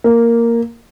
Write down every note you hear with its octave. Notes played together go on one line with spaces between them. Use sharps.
A#3